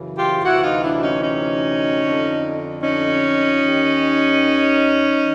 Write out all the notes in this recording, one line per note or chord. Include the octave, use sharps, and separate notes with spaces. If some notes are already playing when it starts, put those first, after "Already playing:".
Already playing: F#2 C#3 E3
F4 G4
D2 C3 E3 E4 F#4
D#4 F4
D4 E4
C#4 D#4
C#4 D#4
F2 D3
C#4 D#4
D#2 D#3
D#3